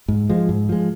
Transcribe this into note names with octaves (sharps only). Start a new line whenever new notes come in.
G#2
F3 G#3
G#2
F3 G#3